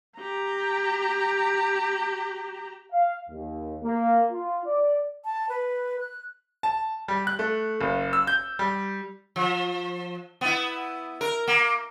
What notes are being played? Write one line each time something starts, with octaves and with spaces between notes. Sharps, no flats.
G4 A#5
F5
D#2
A#3
F4
D5
A5
B4
F#6
A5
G3
F#6
A3
F#1
E6
G6
G3
F3
B3 E4
A#4
A#3